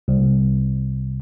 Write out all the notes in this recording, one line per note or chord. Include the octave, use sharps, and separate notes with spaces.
C2